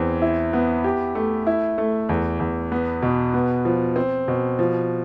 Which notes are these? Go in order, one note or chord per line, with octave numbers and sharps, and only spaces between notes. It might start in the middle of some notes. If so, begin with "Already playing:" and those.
Already playing: E2 C4
E4
B3
G4
A3
E4
A3
E2
E2
B3
B2
B3
F3
C4
B2
F3